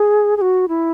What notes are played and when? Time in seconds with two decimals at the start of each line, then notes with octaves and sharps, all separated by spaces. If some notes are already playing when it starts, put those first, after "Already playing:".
Already playing: G#4
0.37 G#4
0.41 F#4
0.68 E4